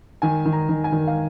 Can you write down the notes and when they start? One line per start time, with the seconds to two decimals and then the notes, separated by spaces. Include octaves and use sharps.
0.22 D#3 G#5
0.45 D#3
0.53 A#5
0.69 D#3
0.84 G#5
0.92 D#3
1.07 F5